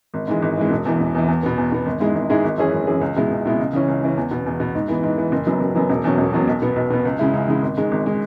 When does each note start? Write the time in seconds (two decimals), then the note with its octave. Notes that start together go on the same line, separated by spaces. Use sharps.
0.14 G#1
0.27 G#2 E3 G#3
0.42 G#1
0.57 G#2 E3 G#3
0.71 E1
0.85 E2 E3
1.00 E1
1.15 E2 E3
1.28 E2
1.43 B2 B3
1.58 E2
1.72 B2 B3
1.86 G#1
2.00 G#2 G#3 E4 G#4
2.15 G#1
2.30 G#2 G#3 E4 G#4
2.44 G#1
2.58 F#2 E3 C#4 G#4
2.73 G#1
2.87 F#2 E3 C#4 G#4
3.01 C#2
3.16 B2 G#3 E4
3.31 C#2
3.45 B2 G#3 E4
3.59 C#2
3.73 C#3 E3 C#4
3.88 C#2
4.02 C#3 E3 C#4
4.17 E2
4.31 B2 B3
4.46 E2
4.60 B2 B3
4.75 G#2
4.88 E3 B3
5.03 G#2
5.18 E3 B3
5.32 F#1
5.46 F#2 F#3 B3
5.61 F#1
5.75 F#2 F#3 B3
5.89 E1
6.04 E2 B2 F#3 C#4
6.18 E1
6.33 E2 B2 F#3 C#4
6.47 B1
6.62 B2 B3
6.76 B1
6.90 B2 B3
7.05 C#2
7.19 C#3 G#3 E4
7.33 C#2
7.48 C#3 G#3 E4
7.62 G#1
7.77 G#2 G#3
7.92 G#1
8.06 G#3